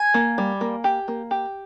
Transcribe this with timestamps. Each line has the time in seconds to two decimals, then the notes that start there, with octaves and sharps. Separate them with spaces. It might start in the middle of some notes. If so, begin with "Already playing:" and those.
Already playing: G#5
0.14 A#3
0.38 G3
0.61 A#3
0.84 G4
1.08 A#3
1.31 G4